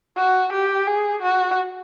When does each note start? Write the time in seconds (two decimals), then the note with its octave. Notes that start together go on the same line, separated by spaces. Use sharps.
0.17 F#4
0.52 G4
0.87 G#4
1.22 F#4